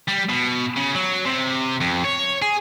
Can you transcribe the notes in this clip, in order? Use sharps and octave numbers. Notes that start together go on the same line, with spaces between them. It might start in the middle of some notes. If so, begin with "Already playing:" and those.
G3
B2
C#3
F#3
C3
F2
C#5
G#4